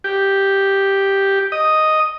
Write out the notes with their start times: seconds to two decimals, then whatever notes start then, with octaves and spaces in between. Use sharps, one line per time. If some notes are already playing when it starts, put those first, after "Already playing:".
0.04 G4
1.52 D#5